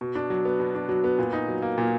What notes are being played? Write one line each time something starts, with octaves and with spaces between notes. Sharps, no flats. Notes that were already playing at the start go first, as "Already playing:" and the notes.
B2
D4
F#3
B3
B2
D4
F#3
B3
A#2
D#4
F#3
A#3
A#2